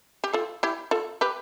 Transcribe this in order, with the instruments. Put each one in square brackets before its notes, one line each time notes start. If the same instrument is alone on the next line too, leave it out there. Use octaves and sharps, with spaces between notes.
[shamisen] G4
F4 A4
E4 G4
F4 A4
G4 B4